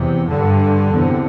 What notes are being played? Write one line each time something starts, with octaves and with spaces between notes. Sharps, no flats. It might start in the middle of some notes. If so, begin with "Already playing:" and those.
Already playing: E2 C3
G2 D3
E2 C3